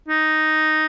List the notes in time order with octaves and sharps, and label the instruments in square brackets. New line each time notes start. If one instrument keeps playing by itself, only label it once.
[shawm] D#4